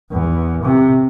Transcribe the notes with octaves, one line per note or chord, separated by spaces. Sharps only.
E2
C3